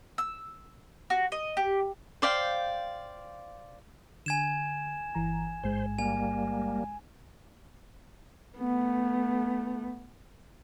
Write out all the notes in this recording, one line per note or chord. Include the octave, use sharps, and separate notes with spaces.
E6
F#4
D#5
G4
C5 D5 F5 G5
D3 G#5 G#6 E7
G1 E3 A#5
A1 G#2 G#3 C5
G3 A#3 G#5
A3 B3